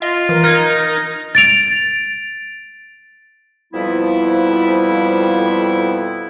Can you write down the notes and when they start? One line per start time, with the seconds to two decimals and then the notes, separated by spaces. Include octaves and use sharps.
0.02 F4 D#5
0.29 E3 A#4
0.44 D#4 F6 G#6
1.35 A6 D7 F7
3.73 F2 B2 F3 G3 B3 E4